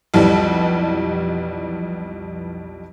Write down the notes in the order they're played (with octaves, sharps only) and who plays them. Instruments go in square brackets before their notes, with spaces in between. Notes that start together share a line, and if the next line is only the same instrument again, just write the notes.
[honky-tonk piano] B1 F2 E3 G3